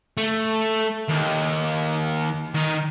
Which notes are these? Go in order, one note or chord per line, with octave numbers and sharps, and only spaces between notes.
A3
D#2
D#3 D#5